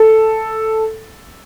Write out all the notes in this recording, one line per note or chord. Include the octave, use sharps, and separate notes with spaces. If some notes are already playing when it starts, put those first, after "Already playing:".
Already playing: A4